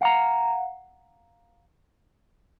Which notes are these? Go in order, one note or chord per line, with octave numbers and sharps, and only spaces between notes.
F5 F#5 A#5